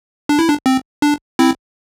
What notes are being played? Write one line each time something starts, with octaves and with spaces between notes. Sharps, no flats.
D4
E4
D4
C4
D4
C4 E4